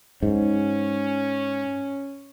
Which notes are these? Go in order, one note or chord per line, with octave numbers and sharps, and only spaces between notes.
G#2 C#4